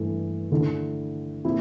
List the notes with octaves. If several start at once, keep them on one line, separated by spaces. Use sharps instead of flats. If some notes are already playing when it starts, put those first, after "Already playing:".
Already playing: G2 E3 A3
D3 A3 E4
A#2 F3 C4 E4